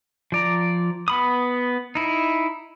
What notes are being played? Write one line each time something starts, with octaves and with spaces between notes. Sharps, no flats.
F3 D5 A#5
B3 B5 D#6
D#4 E4